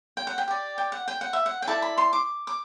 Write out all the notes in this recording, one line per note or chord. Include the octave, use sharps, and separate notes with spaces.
G5
F#5
G5
G4 D5
G5
F#5
G5
F#5
E5
F#5
G5
E4 A4 D5 A5
B5
C6
D6
D6